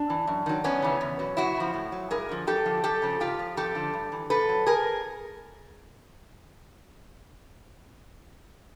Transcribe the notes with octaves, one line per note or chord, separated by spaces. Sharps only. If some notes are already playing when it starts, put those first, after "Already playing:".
Already playing: D4
E3
F#2
D#3 F#3
F#2 B3 C#4
C#3 E3
E2
B2 F#3
F#2 E4 F#4
C#3 F3
A2
F#3
G2 G#4 A#4
D3 F3
F#2 G4 A4
D3 F3
F#2 G4 A4
C#3 F3
G#2 F4 G4
F3
F2 G4 A4
D3 F3
G2
E3
A#2 A4 B4
F#3
G#4 A#4